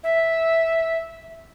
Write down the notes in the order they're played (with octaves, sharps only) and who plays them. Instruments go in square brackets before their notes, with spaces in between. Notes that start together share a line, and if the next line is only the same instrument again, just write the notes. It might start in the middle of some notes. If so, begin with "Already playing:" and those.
[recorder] E5